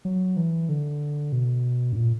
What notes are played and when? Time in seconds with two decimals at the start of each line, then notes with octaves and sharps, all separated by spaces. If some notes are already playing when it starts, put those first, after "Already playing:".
0.05 F#3
0.37 E3
0.69 D3
1.32 B2
1.92 G2
1.96 A#2